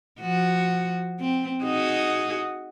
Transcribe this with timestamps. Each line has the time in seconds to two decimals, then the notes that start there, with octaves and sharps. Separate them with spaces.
0.20 F3 F#4
1.20 C4
1.63 D#4 F#4 G#4